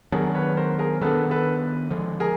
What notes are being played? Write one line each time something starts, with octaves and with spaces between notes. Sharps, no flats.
D#3 F#3 B3 D4 G#4 A#4
B4 C#5
A#4 C5
G#4 A#4
D#3 F#3 B3 D4 A4 B4
A4 B4
D3 F3 G#3
G#4 A#4